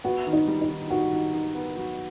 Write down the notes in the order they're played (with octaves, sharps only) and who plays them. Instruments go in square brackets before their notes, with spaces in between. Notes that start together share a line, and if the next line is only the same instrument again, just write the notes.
[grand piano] B3 [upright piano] F#4
[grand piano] D#3
[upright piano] D#4
[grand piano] G3
[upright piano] D#4
[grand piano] D#3
[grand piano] D#3 [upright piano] F#4
[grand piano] D#3
D#3
B3
F#3